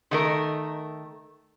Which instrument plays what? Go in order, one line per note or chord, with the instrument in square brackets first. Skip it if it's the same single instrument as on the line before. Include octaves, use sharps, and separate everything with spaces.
[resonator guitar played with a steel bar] D#3 A3 A#4